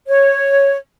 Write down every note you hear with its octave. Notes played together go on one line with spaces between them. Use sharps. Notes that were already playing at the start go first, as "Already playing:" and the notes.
C#5